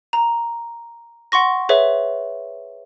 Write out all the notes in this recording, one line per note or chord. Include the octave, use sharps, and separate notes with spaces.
A#5
F#5 C6 C#6 A#6
G#4 B4 C#5 E5